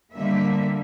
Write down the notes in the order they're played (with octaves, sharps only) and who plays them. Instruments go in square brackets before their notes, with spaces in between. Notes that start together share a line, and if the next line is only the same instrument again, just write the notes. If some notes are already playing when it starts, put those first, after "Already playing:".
[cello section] D3 G3 A#3 E5